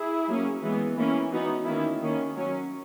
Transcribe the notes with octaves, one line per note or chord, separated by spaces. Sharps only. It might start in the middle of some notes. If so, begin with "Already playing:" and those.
Already playing: E4 G#4
F#3 A#3 C#4
E3 G#3 B3
E3 A#3 C#4
E3 B3 D#4 F#4
D#3 A#3 C#4 E4
D#3 A#3 C#4
F#3 C#4